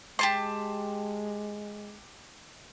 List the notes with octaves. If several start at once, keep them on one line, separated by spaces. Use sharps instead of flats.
G#3 G4 A5 C6